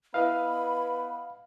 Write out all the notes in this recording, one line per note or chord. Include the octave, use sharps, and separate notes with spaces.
B3 E4 B4 D#5 F5 B5